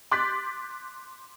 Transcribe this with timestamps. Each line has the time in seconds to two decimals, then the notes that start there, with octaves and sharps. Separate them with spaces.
0.11 C6 D6 F#6 G6 A6 B6